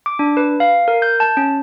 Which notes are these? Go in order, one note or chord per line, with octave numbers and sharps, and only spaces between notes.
D6
D4
B4
F5
A#4
G6
A5
C#4